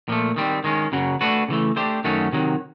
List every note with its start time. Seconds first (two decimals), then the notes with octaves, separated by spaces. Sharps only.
0.08 A#2 F3 A3
0.36 D#3 G3 C4
0.64 D#3 G#3 C#4
0.92 F#2 C#3 F#3
1.21 A3 D4 F#4 B4
1.48 C#3 E3 A3
1.76 A3 D4 G4 C5
2.04 F#2 D#3 F#3 A3 C#4
2.32 C3 D#3 F#3